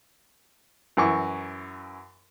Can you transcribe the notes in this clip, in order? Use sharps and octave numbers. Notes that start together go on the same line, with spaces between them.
F#2 E3 C#6